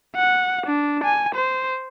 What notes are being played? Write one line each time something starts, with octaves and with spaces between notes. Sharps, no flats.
F#5
D4
G#5
C5